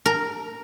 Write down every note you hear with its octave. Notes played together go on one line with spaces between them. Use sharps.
A#4